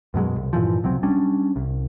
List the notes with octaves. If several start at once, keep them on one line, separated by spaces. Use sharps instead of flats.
F#2 B2 F#3 G#3
C2
G2 A#2 E3 F3
C#2 C3 F#3 C4
G3 C#4 D4
C2